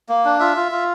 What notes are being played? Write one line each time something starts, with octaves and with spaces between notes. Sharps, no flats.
A#3
D4
F4 E5
F4
F4